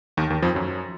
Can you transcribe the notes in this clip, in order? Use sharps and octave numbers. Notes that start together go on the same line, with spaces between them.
D#2 D#3
D#2 D#3
F2 F3
F#2 F#3